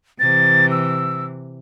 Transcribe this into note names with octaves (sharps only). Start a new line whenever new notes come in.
C3 E3 A6
E6